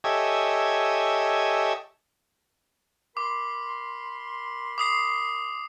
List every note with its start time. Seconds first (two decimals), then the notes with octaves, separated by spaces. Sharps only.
0.04 G4 A4 C#5 D#5 E5 G#5
3.17 A#4 B5 C6 D6
4.78 D6 D#6 C7